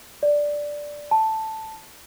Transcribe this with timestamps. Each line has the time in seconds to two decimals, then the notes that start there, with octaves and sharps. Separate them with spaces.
0.23 D5
1.11 A5